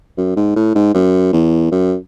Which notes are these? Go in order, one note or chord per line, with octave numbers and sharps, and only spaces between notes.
F#2
G#2
A2
G#2
F#2
E2
F#2